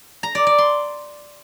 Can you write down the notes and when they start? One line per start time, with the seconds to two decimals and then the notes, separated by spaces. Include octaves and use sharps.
0.23 A#5
0.35 D5
0.47 D5
0.58 C6